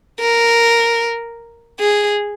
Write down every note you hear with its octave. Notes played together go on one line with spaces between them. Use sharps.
A#4
G#4